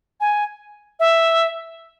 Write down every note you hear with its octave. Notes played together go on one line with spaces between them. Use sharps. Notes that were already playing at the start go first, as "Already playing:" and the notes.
G#5
E5